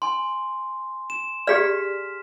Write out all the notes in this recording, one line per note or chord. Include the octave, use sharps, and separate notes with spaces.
G#5 C6
E7
G4 G#4 D5 F6 B6